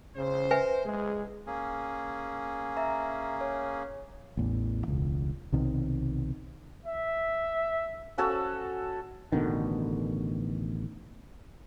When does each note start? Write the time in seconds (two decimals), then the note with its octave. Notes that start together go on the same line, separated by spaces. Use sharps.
0.17 C#3 C5
0.51 B4 E5 G#5
0.85 G#3 G#4
1.47 A#3 C#4 G#4
2.77 E5 A#5
3.41 C#5
4.37 A1 E2
4.88 E1 C#2
5.52 B1 C3 D#3
6.86 E5
8.18 C#4 F#4 A4 C#5
9.32 A1 B2 D3 D#3